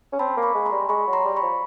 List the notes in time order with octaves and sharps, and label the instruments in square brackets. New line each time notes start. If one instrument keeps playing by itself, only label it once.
[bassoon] C#4
[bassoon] C4 [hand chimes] A5 B5
[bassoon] A#3
[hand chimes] B5 C#6
[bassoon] G#3
[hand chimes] A#5 C6
[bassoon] G3
[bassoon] G#3 [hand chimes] B5 C#6
[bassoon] F#3
[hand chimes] A#5 C6
[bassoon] G3
[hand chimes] B5 C#6
[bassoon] F3